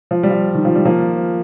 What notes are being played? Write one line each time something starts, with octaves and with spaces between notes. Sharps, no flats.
F3
G3
F3
D#3
F3
G3
F3 A#3